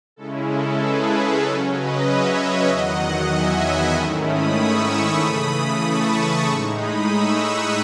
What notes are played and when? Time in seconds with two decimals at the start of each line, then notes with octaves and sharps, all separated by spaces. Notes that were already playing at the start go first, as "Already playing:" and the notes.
0.16 C#3 G#3 C#4 E4 A4
0.48 A4
0.80 G#4 B4
1.42 C#3 F#3 C#4 A4 C#5
1.74 B4 D#5
2.05 C#5 E5
2.37 C#5 E5
2.68 E2 D#3 F#3 D#5 F#5
3.31 E5 G#5
3.63 G#5 B5
3.95 G#2 D#3 A3 C#4 E4 A5 C#6
4.26 B5 D#6
4.58 C#6 E6
5.21 C#3 E3 A3 B5 D#6
5.83 A5 C#6
6.15 B5 D#6
6.47 A2 G#3 D#4 C#6 E6
6.78 B5 D#6
7.10 C#6 E6
7.41 D#6 F#6